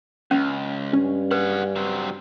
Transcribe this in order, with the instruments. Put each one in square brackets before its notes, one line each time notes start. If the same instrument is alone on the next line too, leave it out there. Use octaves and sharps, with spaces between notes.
[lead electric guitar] C#2 [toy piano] C#4
[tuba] G2 [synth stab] C#4
[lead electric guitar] G#4 F#5 [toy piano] B4
[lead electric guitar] F#3 C4